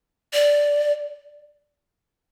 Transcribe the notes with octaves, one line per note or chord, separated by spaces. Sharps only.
D5